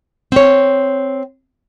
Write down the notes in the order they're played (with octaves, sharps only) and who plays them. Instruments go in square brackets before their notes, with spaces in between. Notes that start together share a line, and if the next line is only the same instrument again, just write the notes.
[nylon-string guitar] C4 C#5